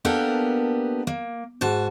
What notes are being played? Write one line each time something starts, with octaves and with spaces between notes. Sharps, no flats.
A#3 B3 D4 G4 A4 A#4
A#3
G#2 F#4 A5